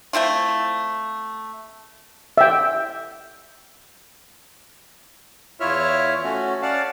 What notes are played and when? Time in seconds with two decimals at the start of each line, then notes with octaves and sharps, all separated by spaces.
0.13 A3 C4 E4 F4
2.38 E5 G5
5.60 E2 E4 F4 C#5 E5 F6
6.24 A3 C#4 F#4
6.62 C#4 D5 F5 F#5 A5